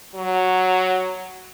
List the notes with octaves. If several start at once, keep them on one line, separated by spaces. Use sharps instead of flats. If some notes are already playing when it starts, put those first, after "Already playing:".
F#3